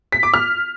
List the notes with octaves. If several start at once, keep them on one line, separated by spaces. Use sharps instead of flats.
B6
D6
F6